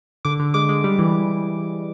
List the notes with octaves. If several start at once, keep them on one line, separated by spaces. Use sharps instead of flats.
D3 D6
D3
G#3 D6
G#3
G3
E3